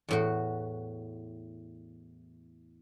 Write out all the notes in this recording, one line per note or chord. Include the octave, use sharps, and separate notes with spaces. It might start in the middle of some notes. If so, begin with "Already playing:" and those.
E2 A2 F#4